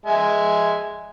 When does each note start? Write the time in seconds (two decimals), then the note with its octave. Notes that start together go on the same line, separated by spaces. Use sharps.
0.06 G#3 E5 G#5